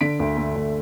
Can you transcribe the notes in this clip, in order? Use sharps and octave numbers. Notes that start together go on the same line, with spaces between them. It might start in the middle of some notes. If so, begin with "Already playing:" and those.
D3 B6 D7
D2
A3
D2